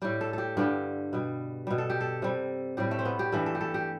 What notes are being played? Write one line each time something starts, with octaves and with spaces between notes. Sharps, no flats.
A2 G3 G4
A4
G4 A4
G2 D3 G3 G4
B2 G3
B2 G3
A4
G4
A4
C3 G3
A2 G3 G4
A3
C4
B3
G4
G2 E3 G3 A4
A4
G4
A4
G4